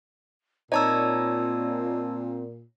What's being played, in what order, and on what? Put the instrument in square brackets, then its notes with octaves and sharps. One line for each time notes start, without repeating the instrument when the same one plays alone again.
[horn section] A#2 [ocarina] C4 [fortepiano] D#4 C#5 A#5 [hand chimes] D5 A5 E6